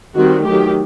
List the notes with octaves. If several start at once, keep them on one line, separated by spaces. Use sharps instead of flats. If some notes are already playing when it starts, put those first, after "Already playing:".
D#3 G3 C4 F#4
D#3 F#3 A3 G4